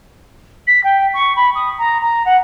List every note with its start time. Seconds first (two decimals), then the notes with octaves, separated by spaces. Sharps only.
0.67 B6
0.84 G5
1.14 C#6
1.36 B5
1.55 D#6
1.78 A#5
2.02 A#5
2.25 F#5